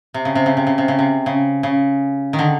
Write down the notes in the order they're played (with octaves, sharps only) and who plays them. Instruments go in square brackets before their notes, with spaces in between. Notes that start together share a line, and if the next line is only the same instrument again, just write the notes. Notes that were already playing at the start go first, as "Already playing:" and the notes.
[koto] C3
C#3
C3
C#3
C3
C#3
C3
C#3
C3
C#3
C#3
D#3
D3